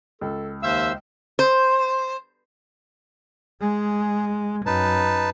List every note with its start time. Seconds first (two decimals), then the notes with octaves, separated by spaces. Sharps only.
0.21 C#2 A4
0.63 D#2 C5 E5 F5 E6
1.39 C5
3.61 G#3 G#4
4.66 F#2 D#4 B4 A5